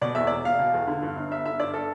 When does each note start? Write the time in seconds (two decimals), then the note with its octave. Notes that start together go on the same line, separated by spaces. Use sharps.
0.02 B2 D5
0.15 E2 E5
0.27 E1 D5
0.45 E1 F5
0.59 B2
0.74 E2
0.87 D3
1.02 G2
1.16 G1
1.30 G1 E5
1.46 D3 E5
1.59 G2 D5
1.74 A4